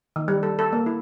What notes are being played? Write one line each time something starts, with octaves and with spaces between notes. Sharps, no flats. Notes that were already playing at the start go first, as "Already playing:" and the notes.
D#3
G3
A4
A4
A#3
E4